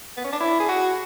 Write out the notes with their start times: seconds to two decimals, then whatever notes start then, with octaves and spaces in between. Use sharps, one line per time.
0.17 B3
0.24 C#4
0.32 D4
0.40 E4
0.60 G#4
0.69 F#4